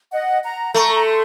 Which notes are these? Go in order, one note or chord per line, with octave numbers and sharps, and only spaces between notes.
D#5 F#5
F#5 A#5
A3 A#5 C#6
A#5
A5 C6